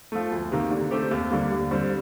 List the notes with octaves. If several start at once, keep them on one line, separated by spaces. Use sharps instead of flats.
F3 A3
D2
C3 D#3 A#3
D3
A3 C4 G4
D#2
D3 G3 A#3
D#2
D3 G3 C4